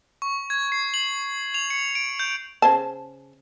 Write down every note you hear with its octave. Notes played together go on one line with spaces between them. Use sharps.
C#6
G#6
C7
F#7
F7
C#7
D7
G6
C#3 C5 A5